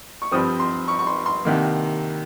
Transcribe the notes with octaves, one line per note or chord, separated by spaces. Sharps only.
C#6
G2 F3 C4 D#6
C6
C#6
C#6
C6
C6
C2 C3 D#3 A#3